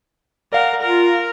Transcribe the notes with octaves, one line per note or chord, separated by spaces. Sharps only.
A#4 D5 F5 F#5
F4 A#4